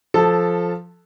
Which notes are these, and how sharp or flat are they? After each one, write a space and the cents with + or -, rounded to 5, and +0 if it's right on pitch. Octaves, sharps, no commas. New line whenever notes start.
F3 +0 A4 -10 A5 +10